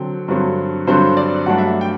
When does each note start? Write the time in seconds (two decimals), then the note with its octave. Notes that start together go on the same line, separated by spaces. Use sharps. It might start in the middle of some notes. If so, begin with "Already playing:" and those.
Already playing: D3 F#3 C4 G5
0.28 G2 D3 F#3 C4
0.87 G2 D3 F#3 C4 C5
1.17 D5
1.46 G2 F#3 A3 D4 F#5
1.58 E5
1.67 F#5
1.81 G5